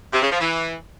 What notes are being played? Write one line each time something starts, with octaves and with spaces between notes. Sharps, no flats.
C3
C#3
F3
E3